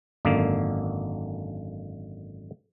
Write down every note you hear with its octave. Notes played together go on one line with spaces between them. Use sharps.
G#1 F#2 D3 A#3